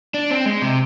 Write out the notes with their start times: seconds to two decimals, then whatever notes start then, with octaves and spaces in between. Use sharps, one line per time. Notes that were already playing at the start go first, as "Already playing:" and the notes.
0.14 D4
0.31 C4
0.46 G#3
0.62 C3